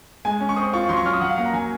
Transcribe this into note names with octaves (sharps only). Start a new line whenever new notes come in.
G#3 G#5
C#4
C#6
C4 D#6
F4 C#6
F#3 C6
C#6
C#4 F6
D#6
F#3 F#5
F5
A#3 F#5
A#5
F#3 G#5